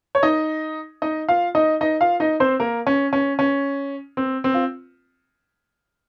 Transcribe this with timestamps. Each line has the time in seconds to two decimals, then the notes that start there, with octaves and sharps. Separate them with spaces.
0.15 C#5
0.23 D#4 D#5
1.02 D#4 D#5
1.29 F4 F5
1.55 D#4 D#5
1.81 D#4 D#5
2.01 F4 F5
2.20 D#4 D#5
2.40 C4 C5
2.60 A#3 A#4
2.87 C#4
3.13 C#4
3.39 C#4
4.17 C4
4.44 C4
4.54 F4